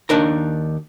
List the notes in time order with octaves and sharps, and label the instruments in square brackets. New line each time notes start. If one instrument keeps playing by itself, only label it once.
[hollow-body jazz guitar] D#2 D4 D#4 A#4 A#5